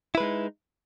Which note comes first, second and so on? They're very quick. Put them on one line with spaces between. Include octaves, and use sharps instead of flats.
E4 B4 G#3 D#4